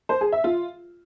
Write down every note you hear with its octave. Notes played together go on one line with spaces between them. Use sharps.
C5
G#4
E5
F4